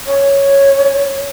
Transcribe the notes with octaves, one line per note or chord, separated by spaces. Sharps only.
C#5